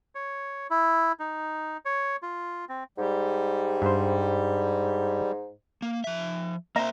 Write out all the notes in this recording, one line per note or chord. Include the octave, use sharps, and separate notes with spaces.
C#5
E4
D#4
C#5
F4
C4
G#2 G3
G2 C5
A#3
F3 E5
A#3 C5 E5 A#5